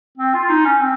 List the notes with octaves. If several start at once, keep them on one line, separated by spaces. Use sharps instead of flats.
C4
F4
F4
D#4
C#4
C4